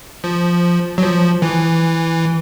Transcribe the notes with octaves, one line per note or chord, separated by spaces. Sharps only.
F3
F#3
F3
E3